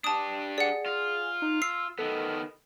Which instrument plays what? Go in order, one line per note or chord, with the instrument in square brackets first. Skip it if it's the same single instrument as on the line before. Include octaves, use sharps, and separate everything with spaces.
[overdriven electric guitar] D4 G4 [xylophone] A5 D#6
[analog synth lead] G#4 [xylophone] D5 F#5
[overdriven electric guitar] F4
[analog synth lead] D#4
[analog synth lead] E6 [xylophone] C7
[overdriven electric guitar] D#3 B3 [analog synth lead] A4